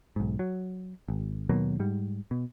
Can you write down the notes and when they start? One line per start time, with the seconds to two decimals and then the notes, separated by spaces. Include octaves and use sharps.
0.16 B1 G#2
0.39 F#3
1.08 G#1
1.49 D#2 B2 F#3 A#3
1.80 G#2 G3
2.31 B2